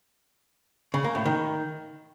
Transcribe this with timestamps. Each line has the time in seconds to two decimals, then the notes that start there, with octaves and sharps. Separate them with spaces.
0.94 C#3
1.04 A#3
1.15 A2
1.26 D#3